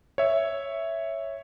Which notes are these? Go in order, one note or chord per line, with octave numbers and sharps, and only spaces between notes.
C#5 E5